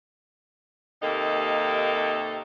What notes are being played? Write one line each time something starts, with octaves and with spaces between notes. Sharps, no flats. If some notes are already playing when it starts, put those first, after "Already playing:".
D#2 C3 A#3 D#4 A4 D#5